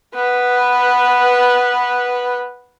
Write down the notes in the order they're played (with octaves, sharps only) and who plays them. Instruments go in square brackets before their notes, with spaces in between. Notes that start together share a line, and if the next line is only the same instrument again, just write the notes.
[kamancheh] B3 B4